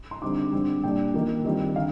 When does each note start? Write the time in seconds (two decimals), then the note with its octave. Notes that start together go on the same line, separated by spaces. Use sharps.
0.11 C6
0.22 D3 G3 C4 D#4 D6
0.52 D3 G3 C4
0.83 A#2 G3 D4 G5
1.14 D#3 A#3 F4
1.45 D#3 G3 C4 F4
1.76 D3 F5